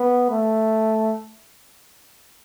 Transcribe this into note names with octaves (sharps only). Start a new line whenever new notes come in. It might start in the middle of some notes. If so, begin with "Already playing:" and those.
Already playing: B3
A3